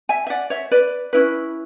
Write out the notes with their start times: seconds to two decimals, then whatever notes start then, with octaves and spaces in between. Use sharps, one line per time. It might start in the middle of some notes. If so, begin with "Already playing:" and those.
0.09 E5 G#5
0.27 E5
0.30 D5 F#5
0.50 C#5 E5
0.71 B4 D5
1.13 C#4 E4 B4